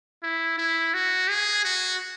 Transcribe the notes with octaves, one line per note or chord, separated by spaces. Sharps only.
E4
E4
F#4
G#4
F#4